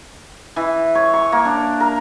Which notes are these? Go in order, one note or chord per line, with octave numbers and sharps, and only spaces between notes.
E3
C#5
C#6
A#3
D4
A#4